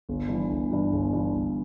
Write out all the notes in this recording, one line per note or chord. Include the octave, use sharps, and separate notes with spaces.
G1
G2 E3
G1
G2 E3
G1
G2 E3
G1